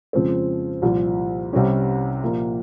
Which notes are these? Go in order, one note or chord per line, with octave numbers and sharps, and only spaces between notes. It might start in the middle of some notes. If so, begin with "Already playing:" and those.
F2 C#3 F3 G#3 C4
C2 A#2 F3
C2 C3 G3 C#4 G4
A#2 F3 A#3 F4